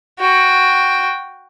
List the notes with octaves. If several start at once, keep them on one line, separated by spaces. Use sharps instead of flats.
F#4 G5